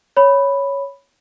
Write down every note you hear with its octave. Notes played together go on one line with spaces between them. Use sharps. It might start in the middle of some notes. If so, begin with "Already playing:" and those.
C#5 B5